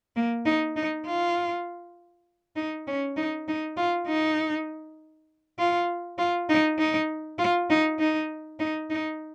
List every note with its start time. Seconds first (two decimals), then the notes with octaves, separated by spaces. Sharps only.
0.16 A#3
0.46 D#4
0.76 D#4
1.06 F4
2.57 D#4
2.87 C#4
3.17 D#4
3.48 D#4
3.77 F4
4.07 D#4
5.59 F4
6.18 F4
6.49 D#4
6.78 D#4
7.39 F4
7.70 D#4
7.99 D#4
8.60 D#4
8.90 D#4